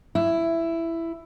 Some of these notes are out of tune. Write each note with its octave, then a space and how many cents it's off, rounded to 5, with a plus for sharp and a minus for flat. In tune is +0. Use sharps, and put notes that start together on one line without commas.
E4 +10